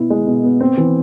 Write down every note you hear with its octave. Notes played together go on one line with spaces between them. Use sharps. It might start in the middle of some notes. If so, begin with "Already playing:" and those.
Already playing: B2 B3 E4
G#3
B2
B3
C4
E3